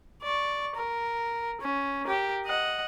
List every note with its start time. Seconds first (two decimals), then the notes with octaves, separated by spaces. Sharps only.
0.23 D5 C#6
0.76 A#4
1.61 C#4
2.05 G4 A#4
2.46 D#5 F#5